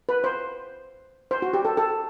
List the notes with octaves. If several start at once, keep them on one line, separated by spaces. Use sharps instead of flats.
B4
C5
C5
F#4
G4
A4
A4